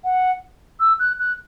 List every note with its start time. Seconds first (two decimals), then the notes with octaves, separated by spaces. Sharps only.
0.04 F#5
0.80 E6
0.99 F#6
1.19 F#6